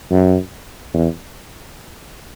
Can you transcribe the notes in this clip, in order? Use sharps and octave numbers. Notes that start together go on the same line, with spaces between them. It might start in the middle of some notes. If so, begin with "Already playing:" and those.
F#2
E2